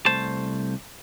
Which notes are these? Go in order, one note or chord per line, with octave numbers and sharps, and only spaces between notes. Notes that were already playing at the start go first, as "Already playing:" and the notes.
C2 A3 C5 A5